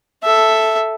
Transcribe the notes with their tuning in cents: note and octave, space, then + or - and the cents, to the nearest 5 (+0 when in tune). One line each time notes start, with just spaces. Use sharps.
A4 +0 E5 +0